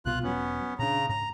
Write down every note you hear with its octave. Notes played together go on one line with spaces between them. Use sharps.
C2 B2 F4 F#6
E1 F#3 B3 C#4
A#2 C#3 D4 A#5
G#2 A#5